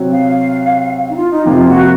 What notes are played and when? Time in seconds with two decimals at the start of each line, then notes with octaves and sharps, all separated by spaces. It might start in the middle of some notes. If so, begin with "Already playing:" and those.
Already playing: C3 F#3 C4 F#4 C#5
0.12 F5
1.10 D#4
1.16 F4
1.31 D#4
1.45 F2 C3 F3 A#3 F4
1.67 F#4